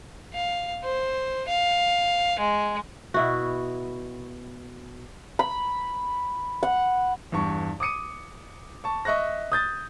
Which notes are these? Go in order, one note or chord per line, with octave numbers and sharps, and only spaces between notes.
F5
C5
F5
G#3
B2 E4 F#4
B5
F#5
E2 G2 C#6
D6 D#6 C#7 D#7
A5 C#6
D#5 E5 C#6 F#6 A#6
D#6 G6 A6